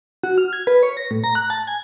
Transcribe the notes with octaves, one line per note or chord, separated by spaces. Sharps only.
F#4
F6
G#6
B4
C#5
A#6
A2
A#5
F#6
A5
G#5